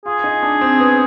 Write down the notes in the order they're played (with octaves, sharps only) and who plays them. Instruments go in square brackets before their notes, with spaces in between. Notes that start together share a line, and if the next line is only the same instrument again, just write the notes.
[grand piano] F4 [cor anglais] G#4
[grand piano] D#4
D4
C4
B3